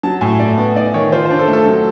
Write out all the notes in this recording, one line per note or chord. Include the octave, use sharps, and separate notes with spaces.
F#3 A5
A2 G#5
A3 D5
B3
D#4 D5
D#3 C#5
F4 C5
D4 C5
A4
A3
A4
F#3